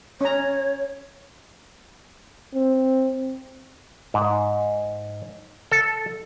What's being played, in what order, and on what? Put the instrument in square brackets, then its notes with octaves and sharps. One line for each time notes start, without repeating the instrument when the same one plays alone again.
[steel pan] C#4 A#5 [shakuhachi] C#5
[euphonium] C4
[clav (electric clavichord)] G#2
A4